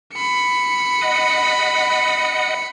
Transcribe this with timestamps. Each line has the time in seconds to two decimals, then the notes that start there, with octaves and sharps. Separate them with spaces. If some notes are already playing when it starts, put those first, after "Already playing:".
0.14 B5 C#7
1.01 D#5 F#5